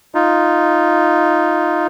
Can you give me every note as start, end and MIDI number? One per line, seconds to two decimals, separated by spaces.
0.15 1.87 63
0.15 1.87 65